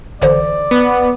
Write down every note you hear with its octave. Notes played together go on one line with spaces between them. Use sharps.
A1 D3 C5 D5
B3